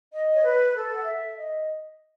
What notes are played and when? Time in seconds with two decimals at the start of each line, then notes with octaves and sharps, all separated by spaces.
0.11 D#5
0.34 C#5
0.43 B4
0.74 A4
0.95 F#5
1.05 E5
1.37 D#5